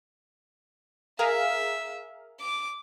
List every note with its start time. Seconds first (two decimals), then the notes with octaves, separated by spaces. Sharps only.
1.19 G#4 A#4 E5 F5
2.40 D6